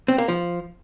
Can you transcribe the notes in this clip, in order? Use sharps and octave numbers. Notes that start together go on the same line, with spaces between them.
C4
A#3
F3